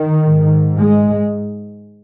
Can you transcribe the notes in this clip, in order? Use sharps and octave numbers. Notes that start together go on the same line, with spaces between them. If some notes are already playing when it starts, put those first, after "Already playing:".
Already playing: D#3
G#2
G#3